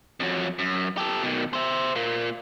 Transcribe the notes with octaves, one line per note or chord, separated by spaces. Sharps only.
F2 F#3
F#2
G4 A4
B2 D#3
C5 E5
A#2 A#3